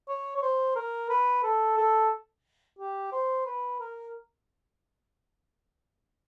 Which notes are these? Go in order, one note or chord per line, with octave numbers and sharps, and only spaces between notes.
C#5
C#5
C5
A#4
B4
A4
A4
G4
C5
B4
A#4